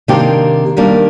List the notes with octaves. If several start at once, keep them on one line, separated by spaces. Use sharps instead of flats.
C3 D#3 A#3 D4 G4
D#3 G3 A#3 D4